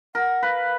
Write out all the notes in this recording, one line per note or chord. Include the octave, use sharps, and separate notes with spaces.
A#4 F#5
B4 F5